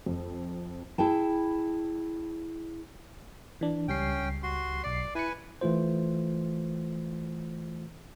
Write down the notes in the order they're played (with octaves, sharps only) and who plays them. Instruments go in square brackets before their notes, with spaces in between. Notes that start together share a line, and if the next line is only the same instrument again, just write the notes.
[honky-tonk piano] F2
[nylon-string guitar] E4 G#4 G5 A5
[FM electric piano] E3 D4
[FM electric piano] C#2 G3 C7 [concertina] C#4 G5
[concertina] F#4 C6
[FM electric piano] B1 C7 [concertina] D5
[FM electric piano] E4 C#7 [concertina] B4 G#5
[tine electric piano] E3 A3 F4 C5